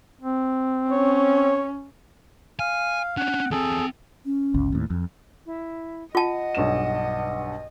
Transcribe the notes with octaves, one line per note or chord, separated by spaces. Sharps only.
C4
C#4 C#5
F5 G#5
C#4 D4 F#5
E2 C4 G#4 A4
C#4
G1 C#2
D#2 A2
F2
E4
F4 D#5 F#5 A5
B1 G2 E7